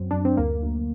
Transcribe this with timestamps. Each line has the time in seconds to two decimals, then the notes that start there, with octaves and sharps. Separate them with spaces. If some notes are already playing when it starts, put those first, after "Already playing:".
Already playing: F#2 F#3 C4
0.11 F#2 D4
0.25 C4
0.37 D2 A#3
0.62 D2